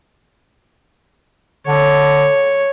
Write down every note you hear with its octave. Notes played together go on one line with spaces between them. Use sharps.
D3 C#5